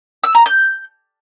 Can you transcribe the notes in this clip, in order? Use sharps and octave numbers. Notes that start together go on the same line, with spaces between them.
E6
A#5
G6